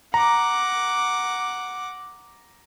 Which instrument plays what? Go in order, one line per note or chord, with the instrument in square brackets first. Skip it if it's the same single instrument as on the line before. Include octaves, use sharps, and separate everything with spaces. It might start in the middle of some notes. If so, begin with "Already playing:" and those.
[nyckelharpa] F#5 D6 [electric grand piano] A#5